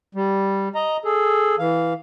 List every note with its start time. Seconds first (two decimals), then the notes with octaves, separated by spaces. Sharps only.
0.15 G3
0.75 D#5 A#5
1.05 G#4 A4
1.59 E3 F5